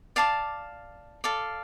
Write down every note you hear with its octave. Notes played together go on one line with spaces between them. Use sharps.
D5 F5 A5 D6
A4 D5 F5